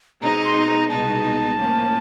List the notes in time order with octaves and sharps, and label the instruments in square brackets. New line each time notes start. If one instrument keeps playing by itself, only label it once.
[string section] B2 G#3 C4 D#4 [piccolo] A#5
[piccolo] C6
A#5
[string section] C2 B2 G#3 B3 D#4 [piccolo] A5
[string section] A2 F3 A#3 C#4